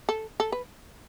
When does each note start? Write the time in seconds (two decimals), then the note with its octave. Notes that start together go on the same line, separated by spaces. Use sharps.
0.09 A4
0.40 A4
0.52 B4